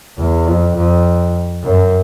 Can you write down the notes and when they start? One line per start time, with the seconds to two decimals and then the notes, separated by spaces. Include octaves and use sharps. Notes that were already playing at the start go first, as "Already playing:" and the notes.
0.18 E2
0.47 F2
0.76 F2
1.64 F#2